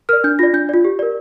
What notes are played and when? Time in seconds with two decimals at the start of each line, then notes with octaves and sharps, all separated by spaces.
0.09 A#4 D5 F6
0.24 D4 G6
0.39 F4 D5 A#6
0.54 D4 G6
0.69 F4 D5
0.84 G4
0.99 A#4 D5